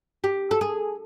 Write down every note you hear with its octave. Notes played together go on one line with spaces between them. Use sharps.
G4
A4
G#4